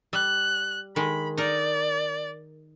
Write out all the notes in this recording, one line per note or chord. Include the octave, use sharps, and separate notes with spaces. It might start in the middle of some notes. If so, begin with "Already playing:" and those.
G3 F#6
D#3 G#3 B5
D#4 A#4 D5